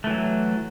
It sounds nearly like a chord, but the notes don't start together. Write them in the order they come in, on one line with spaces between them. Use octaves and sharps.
A3 E3 F#3